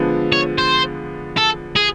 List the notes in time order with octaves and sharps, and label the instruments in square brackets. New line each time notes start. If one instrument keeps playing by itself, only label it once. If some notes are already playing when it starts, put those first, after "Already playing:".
Already playing: [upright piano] D3 F3 G#3 B3
[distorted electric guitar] C#5
C5
A4
G#4